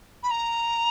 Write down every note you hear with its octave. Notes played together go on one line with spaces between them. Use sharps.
B5
A#5